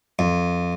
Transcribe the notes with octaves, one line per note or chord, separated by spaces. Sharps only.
F2